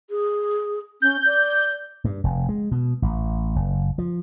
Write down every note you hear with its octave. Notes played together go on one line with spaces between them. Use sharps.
G#4
C#4 G6
D5
G2
F1
G#3
B2
A1
F#1
F3